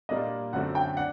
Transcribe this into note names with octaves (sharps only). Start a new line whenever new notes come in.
A#2 G3 A#3 D4 D#5
F#2 D3 A3 C4 F#4 F#5
G5
D4 F#5